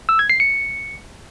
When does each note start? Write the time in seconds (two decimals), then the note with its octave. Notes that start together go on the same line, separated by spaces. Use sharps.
0.09 E6
0.19 G#6
0.30 C7
0.40 C#7